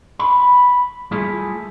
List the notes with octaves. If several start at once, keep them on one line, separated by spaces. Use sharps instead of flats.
B5
G3 A3 E4 F4 G#4 A4